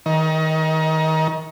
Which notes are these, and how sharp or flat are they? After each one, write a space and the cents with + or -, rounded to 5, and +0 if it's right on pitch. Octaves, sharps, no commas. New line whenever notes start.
D#3 +25 A#4 +25